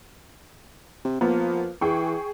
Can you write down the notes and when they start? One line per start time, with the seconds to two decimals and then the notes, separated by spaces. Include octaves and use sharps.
1.05 C3
1.21 F3 A#3 B3
1.81 E3 G#4 G5 C#6